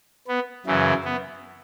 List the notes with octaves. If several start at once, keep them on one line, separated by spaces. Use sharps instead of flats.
B3
F#2 C#3 E3
B3